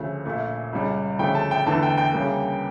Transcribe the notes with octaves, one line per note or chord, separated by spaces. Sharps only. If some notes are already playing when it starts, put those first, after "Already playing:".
Already playing: D2 C#3 F3 A3
A#1 A#2 A3
C#2 C#3 G3
D2 C#3 F3 A3 G5
A5
G5
E2 D3 A3 A5
G5
G5
D2 C#3 G3 A#3